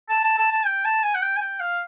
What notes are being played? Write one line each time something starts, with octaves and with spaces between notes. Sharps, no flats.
A5
A5
A5
A5
G5
A5
G#5
F#5
G5
G#5
G5
F5